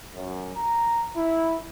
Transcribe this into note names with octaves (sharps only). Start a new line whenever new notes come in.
F#2
A#5
E4